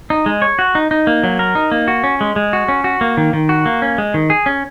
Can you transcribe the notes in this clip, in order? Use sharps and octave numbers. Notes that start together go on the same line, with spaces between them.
D#4
G#3
C#5
F#4
D#4
D#4
A#3
F#3
A#4
D#4
A#3
F#4
C#4
G#3
G#3
F#4
C#4
F#4
A#3
D#3
D#3
F#4
A#3
C#4
G#3
D#3
G#4
C#4